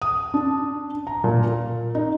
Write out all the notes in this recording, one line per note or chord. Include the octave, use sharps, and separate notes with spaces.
D#6
D4
A#5
A#2
A#4
D#4